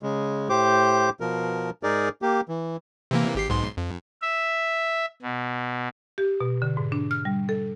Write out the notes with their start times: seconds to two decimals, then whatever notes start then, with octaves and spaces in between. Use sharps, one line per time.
0.03 C#3 G#3
0.49 A2 G4 C5 D6
1.20 B2 F3 A#4
1.83 G#2 D#4 G#4 A#4 D5
2.22 A#3 G4
2.49 E3
3.11 C3 E3 A#3
3.35 G#1 G4 C7
3.49 B1 G#2 C6
3.77 F2
4.22 E5
5.22 B2
6.18 G4
6.40 B2
6.62 D3
6.77 G#2
6.92 D4
7.11 F6
7.25 G3
7.49 A4